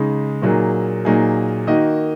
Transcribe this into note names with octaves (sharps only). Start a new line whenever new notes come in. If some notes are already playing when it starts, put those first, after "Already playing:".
Already playing: C#3 G#3 D#4
A#2 F#3 A#3 D#4 G#4
A#2 F#3 A#3 D#4 G#4
D#3 A#3 D#4 F#4 D#5